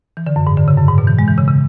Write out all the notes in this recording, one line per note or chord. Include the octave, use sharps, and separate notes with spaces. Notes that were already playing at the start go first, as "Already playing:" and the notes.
E3
D3
F#2
G#2
D3
C#3
F#2
G#2
B2
E3
G#3
E3
C#3
C#3